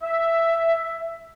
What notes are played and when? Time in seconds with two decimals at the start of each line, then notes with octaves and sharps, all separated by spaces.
0.02 E5